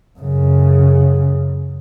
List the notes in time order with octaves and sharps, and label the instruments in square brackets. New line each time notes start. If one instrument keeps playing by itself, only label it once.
[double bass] F#2 C#3